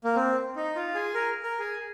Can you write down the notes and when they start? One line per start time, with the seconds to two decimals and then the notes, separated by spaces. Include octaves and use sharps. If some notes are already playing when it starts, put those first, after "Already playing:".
0.04 A#3
0.16 C4
0.56 D#4
0.75 F4
0.94 G#4
1.14 A#4
1.43 A#4
1.59 G#4